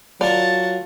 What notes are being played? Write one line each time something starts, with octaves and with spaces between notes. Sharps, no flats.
F#3 F4 A#4 D5 F#5 A5